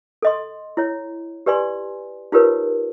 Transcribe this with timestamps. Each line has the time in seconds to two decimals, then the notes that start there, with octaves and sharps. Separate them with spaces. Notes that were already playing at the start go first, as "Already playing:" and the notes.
0.22 A4 D#5 C6
0.77 E4 C#5
1.46 G4 B4 D5 G#5 C6
2.32 D#4 F4 G4 A#4 B4 C#5